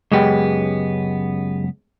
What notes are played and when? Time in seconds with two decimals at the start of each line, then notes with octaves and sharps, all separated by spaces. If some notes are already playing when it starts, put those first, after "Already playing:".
0.12 C#2 F#2 G#3 B3 G4 G5